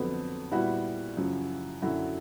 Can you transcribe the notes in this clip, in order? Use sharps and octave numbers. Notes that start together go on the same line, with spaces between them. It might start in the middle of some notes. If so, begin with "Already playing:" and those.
Already playing: F2 D3 F#3 B3
A#2 G3 B3 E4 F#4
F#2 C#3 F3
F#2 D3 F#3 E4 F#4